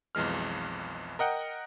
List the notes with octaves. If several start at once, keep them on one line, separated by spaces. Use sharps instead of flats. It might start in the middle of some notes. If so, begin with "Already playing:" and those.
B1 F2 E3 G#3 F6
A#4 D#5 F#5 G5